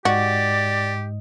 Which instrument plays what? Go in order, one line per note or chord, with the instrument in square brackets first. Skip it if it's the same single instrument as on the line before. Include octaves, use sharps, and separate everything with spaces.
[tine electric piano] G#2 G#3 D#5 [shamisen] F#4 [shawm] G4 [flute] D5